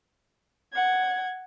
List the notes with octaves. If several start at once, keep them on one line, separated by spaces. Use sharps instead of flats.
F#5 G#6